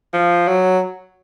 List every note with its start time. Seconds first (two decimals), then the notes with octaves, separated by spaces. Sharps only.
0.13 F3
0.48 F#3